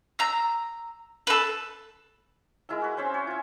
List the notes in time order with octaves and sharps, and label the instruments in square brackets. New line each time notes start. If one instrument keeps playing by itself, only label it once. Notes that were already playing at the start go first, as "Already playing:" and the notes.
[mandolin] A#5 E6
A4 B4
[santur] G#3 E4 A#4 E6
F#4 B4
C4 C#4 C5 E5
C#5
F4 G#5